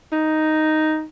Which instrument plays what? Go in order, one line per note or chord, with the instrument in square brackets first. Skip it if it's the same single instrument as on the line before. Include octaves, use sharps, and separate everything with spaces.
[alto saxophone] D#4